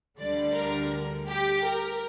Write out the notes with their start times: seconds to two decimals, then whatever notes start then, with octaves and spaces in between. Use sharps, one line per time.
0.18 D2 D3 G3 D5
0.55 A#4
1.27 G4
1.64 A#4